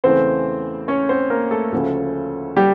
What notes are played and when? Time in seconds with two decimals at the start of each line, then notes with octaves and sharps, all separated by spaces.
0.04 E2 C#3 E3 A3 C4 C5
0.88 C#4 C#5
1.09 C4 C5
1.30 A#3 A#4
1.51 A3 A4
1.72 D2 C#3 F3 A3 C#4
2.57 G3 G4